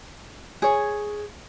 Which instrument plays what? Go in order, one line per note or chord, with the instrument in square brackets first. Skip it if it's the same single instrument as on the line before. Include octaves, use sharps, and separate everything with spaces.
[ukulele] G#4 C#5